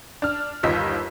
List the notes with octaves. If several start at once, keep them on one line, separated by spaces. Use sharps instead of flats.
D4 F6
G1 D#2 F4 D#5 E6 B6